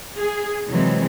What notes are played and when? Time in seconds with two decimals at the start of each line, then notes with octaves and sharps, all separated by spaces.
0.18 G#4
0.67 C3 E3 F#3 G#3 C4